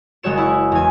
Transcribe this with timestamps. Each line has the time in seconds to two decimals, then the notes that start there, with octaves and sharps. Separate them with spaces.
0.23 F#1 G#3 F#4 C#5 E7
0.38 E4 C#6
0.72 E2 G#5